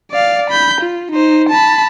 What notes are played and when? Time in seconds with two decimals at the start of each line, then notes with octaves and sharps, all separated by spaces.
0.11 D5 F5
0.50 B5 G6
0.81 F4
1.11 D#4 C5
1.49 A5 B5